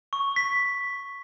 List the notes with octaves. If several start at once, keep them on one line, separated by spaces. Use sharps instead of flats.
C#6
B6